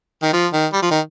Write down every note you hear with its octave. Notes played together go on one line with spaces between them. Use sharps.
D#3
F3
D#3
G3
F3
D#3